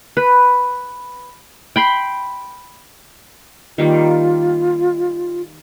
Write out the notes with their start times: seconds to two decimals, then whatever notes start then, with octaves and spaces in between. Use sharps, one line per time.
0.17 B4
1.76 G5 B5 C6
3.78 D#3 G3 A#3 F4